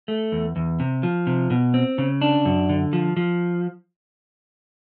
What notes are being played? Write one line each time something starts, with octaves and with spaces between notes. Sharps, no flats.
A3
E2
E2
C3
F3
C3
B2
C4
C#3
D4
F#2
D3
F3
F3